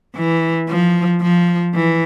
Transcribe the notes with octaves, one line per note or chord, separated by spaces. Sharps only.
E3
F3
F3
E3